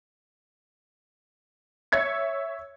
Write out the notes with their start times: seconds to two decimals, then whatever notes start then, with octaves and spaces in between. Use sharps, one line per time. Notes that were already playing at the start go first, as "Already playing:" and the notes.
1.92 C#5 E5 G#6 C#7